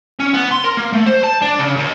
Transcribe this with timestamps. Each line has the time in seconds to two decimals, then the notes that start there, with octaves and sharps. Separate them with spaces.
0.20 C#4
0.34 B3
0.52 C6
0.64 A#4
0.77 A#3
0.93 A3
1.06 C5
1.23 A5
1.42 D4
1.59 C#3
1.76 D#2